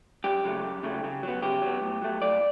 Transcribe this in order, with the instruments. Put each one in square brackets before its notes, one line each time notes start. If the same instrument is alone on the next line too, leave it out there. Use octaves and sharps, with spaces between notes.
[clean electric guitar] F#2 G4
C#3 F#3 A3
F#2
C#3 F#3 A3
C#3
F#3 B3
C#3 G4
F#3 B3
A2
F#3 A3
A2 D5